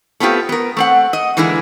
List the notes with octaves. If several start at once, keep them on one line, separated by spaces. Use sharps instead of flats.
A3 B3 C4 F4 G4
B3 A#4
A3 C4 F#5
D#5
D3 E3 G#3 A#3 E4